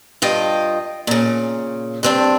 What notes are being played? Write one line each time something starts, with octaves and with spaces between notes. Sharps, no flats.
G2 F4 D#5 G5
A#2 C#3
G2 C4 D4